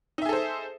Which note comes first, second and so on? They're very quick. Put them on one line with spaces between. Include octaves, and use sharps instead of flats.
D#4 E5 G#4 A4 C5